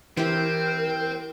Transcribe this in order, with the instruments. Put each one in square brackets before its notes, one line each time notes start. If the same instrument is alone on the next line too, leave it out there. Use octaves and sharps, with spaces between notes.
[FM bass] E3 [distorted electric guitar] C4 [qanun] E4 G4 C5 [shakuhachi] A#4